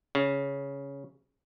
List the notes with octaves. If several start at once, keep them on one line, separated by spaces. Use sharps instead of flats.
C#3